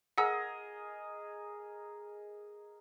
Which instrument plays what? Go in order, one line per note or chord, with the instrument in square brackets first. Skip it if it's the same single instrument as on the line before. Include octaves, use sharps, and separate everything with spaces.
[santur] G#4 A#4 D#5 [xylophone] F#5 E6